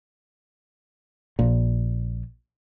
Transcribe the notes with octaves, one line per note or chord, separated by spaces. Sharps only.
A#1 A#2